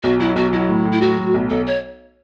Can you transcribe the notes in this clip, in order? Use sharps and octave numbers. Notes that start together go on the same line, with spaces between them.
B1 F#4
F#3 E4
B1 F#4
F#3 E4
A2
A2
E4
F#3 F#4
A2
B1
B1 A4
C#5